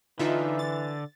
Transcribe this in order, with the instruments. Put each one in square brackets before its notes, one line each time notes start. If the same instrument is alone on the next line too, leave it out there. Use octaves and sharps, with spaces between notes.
[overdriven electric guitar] D3 [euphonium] E3 [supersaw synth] D#4 F4 E5
[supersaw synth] A6